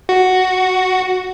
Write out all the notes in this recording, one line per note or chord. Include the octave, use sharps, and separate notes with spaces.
F#4